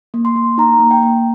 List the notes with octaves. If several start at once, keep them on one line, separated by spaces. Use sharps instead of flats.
A#3
C6
A#3
D#4 A#5
A#3
G5
A#3